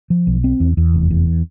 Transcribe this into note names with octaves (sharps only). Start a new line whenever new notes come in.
F3
B1
C4
E2
E2
F1
E2